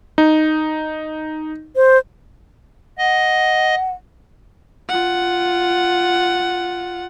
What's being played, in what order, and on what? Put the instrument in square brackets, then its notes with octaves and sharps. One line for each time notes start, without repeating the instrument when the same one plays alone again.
[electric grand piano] D#4
[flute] C5
[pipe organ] D#5 [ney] F#5
[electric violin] F4 F#5